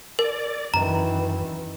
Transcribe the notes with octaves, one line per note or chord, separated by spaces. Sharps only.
A#4 D5
F#2 D#3 E3 A#5